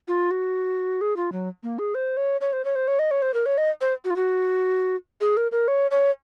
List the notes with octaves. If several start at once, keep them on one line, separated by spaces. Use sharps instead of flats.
F4
F#4
G#4
F4
F#3
A#3
G#4
C5
C#5
C#5
C5
C#5
C5
C#5
D#5
C#5
C5
A#4
C#5
D#5
C5
F#4
F4
F#4
G#4
A#4
A#4
C#5
C#5